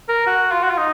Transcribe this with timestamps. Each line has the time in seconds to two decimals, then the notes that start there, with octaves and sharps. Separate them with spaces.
0.08 A#4
0.26 F#4
0.52 F4
0.63 F#4
0.70 F4
0.78 D#4